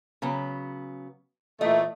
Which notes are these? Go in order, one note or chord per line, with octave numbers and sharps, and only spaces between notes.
C#3 F#3 B3
A#2 E3 A3 D#5